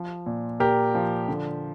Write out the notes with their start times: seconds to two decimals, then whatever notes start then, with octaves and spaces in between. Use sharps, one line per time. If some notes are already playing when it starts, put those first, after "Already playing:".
Already playing: F3
0.26 A#2
0.60 A#2 G4 A#4
0.95 F3
1.28 D3